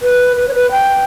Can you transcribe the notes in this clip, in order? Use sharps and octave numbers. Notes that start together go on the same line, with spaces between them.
B4
B4
C#5
B4
G5